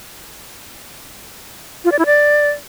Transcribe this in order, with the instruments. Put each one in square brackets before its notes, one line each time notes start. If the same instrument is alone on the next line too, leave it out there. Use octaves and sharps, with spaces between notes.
[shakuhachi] F4
D5
E4
D5